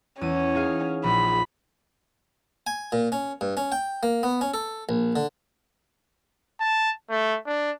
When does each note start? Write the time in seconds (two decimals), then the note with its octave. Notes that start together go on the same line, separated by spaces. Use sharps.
0.21 E2 C#4 D#7
0.55 D#4 G#4 F5
1.04 A#1 B5
2.67 G#5
2.92 A#2
3.12 C#4
3.41 G2
3.57 C#4
3.72 G5
4.03 A#3
4.23 B3
4.41 C#4
4.54 A4
4.89 A#1
5.16 D3
6.60 A5
7.10 A3
7.47 D4